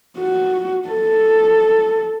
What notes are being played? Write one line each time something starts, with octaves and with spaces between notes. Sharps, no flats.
F#4
A4